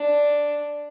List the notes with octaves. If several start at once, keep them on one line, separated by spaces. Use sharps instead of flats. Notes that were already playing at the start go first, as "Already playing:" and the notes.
Already playing: D4